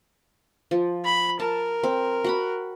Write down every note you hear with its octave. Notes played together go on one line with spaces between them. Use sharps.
F3
B5
A#4 A5
C4
F#4 F#5 B5